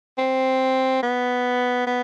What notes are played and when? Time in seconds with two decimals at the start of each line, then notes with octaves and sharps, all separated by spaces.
0.18 C4
1.02 B3
1.87 B3